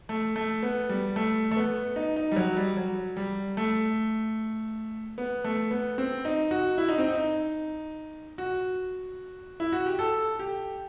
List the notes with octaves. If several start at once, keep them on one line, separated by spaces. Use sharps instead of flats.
A3
A3
B3
G3
A3
A3
B3
D#4
D#4
G3
F#3
G3
F#3
G3
A3
B3
A3
B3
C4
D#4
F#4
E4
D#4
C4
D#4
F#4
E4
F#4
G4
A4
G4